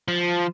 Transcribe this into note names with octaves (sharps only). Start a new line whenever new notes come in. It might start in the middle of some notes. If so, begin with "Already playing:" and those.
F3